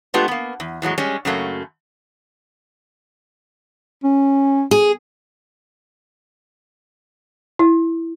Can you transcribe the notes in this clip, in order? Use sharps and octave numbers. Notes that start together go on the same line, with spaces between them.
G#3 A3 B3 D4 F4 G4
A#3 B3
E2
E2 A2 F#3 G#3
G3 G#3 C#4
F#2 C#3 F#3 A3 A#3
C#4
G#4
E4